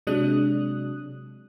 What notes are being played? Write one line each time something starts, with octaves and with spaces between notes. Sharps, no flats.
C3 F#3 G#3 D4 D#6 F#6